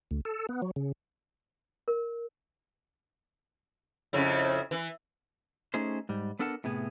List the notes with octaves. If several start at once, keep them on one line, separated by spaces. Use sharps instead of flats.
D2
A4
B3
F#3
C#3
A#4
F2 C#3 E4
E3
A3 C#4 D#4 G#4 C5
G#2 G3
B3 D4 A4 A#4 F#5 A5
A2 C3 B3 G#4